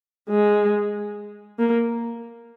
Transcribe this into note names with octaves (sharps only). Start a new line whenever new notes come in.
G#3
A#3